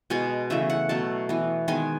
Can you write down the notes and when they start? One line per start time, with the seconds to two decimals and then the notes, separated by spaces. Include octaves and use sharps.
0.10 B2 G#3 B3 G#5
0.50 C#3 E3 A3 E5
0.70 F#5
0.89 B2 F#3 A3 A5
1.29 E3 B3
1.68 D#3 G#3 B3 G#5